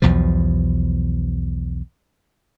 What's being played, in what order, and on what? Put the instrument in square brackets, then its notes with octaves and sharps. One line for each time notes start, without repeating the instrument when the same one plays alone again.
[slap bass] B1 E2 B2 F3